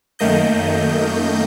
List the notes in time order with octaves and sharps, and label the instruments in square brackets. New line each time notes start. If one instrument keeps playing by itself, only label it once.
[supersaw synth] F#2 D#3 A3 A#3 D#5 G6